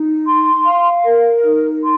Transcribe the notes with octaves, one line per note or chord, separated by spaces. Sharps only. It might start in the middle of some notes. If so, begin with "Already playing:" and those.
Already playing: D#4
C6
F5
A#4
D#4
C6